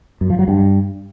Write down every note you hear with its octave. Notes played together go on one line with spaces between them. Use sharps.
F#2
F3
F#3
G2